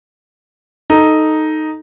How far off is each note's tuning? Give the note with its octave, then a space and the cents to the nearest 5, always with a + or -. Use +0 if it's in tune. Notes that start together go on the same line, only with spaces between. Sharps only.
D#4 +0 A4 +0